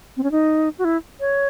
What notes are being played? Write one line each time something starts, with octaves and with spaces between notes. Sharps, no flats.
C4
C#4
D#4
F#4
E4
C#5